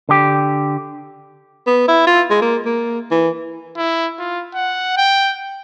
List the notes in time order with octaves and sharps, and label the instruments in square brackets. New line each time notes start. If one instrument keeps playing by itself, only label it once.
[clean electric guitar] D3 G4
[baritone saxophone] B3
E4
F4
G#3
A#3
A#3
E3
[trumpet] E4
F4
F#5
G5